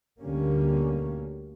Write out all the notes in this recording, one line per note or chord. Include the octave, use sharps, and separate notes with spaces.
D2 D3 G3 A#3 C#4